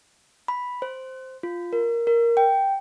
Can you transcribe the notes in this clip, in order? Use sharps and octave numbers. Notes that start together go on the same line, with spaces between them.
B5
C5
F4
A#4
A#4
G5